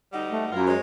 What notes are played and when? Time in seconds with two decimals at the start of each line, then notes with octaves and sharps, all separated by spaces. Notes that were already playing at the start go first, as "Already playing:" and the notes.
0.13 D2 G3 D#4 F#5
0.30 A3
0.52 F#2 E4 F4 A#4
0.67 G#3 C5 C#5